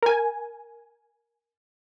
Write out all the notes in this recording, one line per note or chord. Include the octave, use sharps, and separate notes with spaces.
A#4 G#5